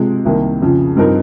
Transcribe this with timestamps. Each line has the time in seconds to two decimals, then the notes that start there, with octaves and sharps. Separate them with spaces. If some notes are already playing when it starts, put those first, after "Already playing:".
Already playing: C3 F3 G#3
0.25 C2 C3 D#3 A#3
0.62 F2 C#3 F3
0.97 G2 F3 C4 D#4 A#4